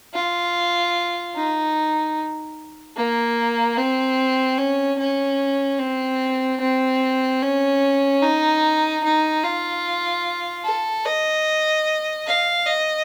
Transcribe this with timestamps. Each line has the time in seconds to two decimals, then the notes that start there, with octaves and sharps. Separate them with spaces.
0.14 F4
1.35 D#4
2.96 A#3
3.77 C4
4.58 C#4
4.98 C#4
5.79 C4
6.60 C4
7.42 C#4
8.22 D#4
9.03 D#4
9.43 F4
10.64 A4
11.05 D#5
12.26 F5
12.66 D#5